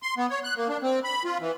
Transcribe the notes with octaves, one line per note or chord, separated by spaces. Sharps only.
C6
B3
C#5
F#6
A#3
D4
C4
B5
F4
E3